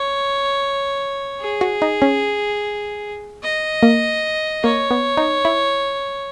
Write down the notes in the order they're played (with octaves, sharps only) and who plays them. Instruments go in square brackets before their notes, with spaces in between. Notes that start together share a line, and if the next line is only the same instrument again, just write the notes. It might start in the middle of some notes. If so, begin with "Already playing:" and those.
Already playing: [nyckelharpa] C#5
G#4
[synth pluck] F#4
D#4
C#4
[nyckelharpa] D#5
[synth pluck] A#3
[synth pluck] A#3 [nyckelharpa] C#5
[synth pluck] B3
D#4
E4